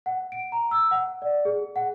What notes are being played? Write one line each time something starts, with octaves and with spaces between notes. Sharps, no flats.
F#5
D7
A#5
E6
F#5
D5
G#4
F#5